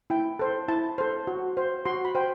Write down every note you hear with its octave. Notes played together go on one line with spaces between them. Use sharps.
E4 G5
A4 C5
E4 A5
A4 C5
F#4
C5
F#4 C6
B5
C5 G5